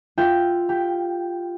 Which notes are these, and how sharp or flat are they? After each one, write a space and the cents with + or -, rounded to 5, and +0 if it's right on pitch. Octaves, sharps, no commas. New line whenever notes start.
F4 +0 E5 +0 G5 +0
G4 +20 G5 +0